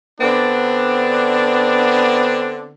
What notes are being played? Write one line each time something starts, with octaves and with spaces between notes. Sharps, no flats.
D3 B3 C4 D4